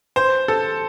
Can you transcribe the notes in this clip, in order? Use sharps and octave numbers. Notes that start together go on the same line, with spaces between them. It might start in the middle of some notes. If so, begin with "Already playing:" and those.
C5
A4